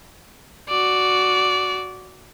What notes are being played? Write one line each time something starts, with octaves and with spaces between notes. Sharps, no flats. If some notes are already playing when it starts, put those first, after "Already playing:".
F#4 D5